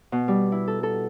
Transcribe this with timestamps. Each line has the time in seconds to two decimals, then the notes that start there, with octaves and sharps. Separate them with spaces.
0.12 B2
0.28 G3
0.52 E4
0.68 A4
0.83 A4